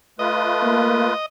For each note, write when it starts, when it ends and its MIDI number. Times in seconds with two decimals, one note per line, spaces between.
0.19 1.14 57
0.19 1.14 65
0.19 1.14 71
0.19 1.26 75
0.63 1.07 58